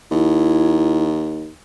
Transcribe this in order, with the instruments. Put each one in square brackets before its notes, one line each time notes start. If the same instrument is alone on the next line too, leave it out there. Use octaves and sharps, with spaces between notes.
[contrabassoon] D#2 [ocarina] E4